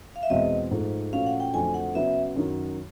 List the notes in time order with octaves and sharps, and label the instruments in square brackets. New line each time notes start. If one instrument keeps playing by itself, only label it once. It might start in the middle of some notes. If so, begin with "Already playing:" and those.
[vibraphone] F5
E5
[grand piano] E2 B2 G#3 C4 [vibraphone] D#5
[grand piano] G#2 F3 A3
[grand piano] A#2 F3 A3 C#4 F#4 [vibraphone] F5
[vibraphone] F#5
G5
[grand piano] F2 D3 F#3 A3 [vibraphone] G#5
[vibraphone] F#5
[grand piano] C#3 F#3 B3 [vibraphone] E5
[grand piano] F#2 D#3 F#3